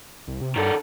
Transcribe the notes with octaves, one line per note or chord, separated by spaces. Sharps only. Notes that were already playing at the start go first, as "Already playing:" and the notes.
C2
C3
G2 D#3 A4